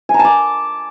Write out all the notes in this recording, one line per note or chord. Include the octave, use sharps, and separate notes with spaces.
G#5
A#5
A5
D6